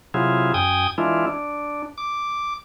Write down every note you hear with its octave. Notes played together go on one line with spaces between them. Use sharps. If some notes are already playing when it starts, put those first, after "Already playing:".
C3 F#3 E4 F4 G#4
F#2 G5 G#5 D#6
E3 G#3 D4 E4 F4
D4
D6